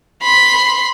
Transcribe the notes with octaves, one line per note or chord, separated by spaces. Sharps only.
B5 C6